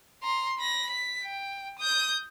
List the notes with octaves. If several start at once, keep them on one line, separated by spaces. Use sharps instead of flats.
A#5 C6
B5 A#6
B6
G5
D#6 G6